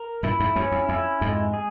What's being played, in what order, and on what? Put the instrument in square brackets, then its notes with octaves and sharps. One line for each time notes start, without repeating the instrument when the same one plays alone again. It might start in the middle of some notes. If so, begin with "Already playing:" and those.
Already playing: [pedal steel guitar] A#4
[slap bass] G2 A#2 [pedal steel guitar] E4
[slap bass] F2 G#2
[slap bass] E2 G2 [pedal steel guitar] C#4
[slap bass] F2
[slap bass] F2 [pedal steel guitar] E4
[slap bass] F2 G#2 [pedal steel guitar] G#3
[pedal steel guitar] G#4